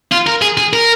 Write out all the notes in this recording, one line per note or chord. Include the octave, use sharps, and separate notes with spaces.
F4
A#4
G#4
G#4
A#4